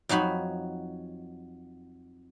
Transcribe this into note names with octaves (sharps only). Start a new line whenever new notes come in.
F2 F#3 D#4 F#4 B5